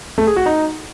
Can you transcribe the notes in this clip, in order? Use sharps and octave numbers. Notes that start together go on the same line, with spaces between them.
A3
G#4
F#4
D#4